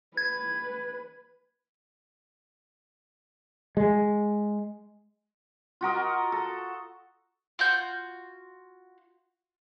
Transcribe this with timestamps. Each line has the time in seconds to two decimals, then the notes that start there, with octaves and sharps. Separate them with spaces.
0.17 B4 G#6
3.77 G#3
5.81 F4 F#4 A#4 D#5
6.32 A4
7.59 F4 F#4 G6